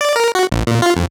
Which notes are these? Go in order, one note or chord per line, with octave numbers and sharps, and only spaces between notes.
D5
A#4
F#4
A#1
A#2
F4
F2